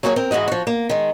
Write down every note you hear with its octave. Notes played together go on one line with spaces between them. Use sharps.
F#3 A#3 F#4 G#4 B4 C#5
C4 A#4
G#2 E3 G#3 F#4 D#5
F3 F#4
A#3
D#3 G#3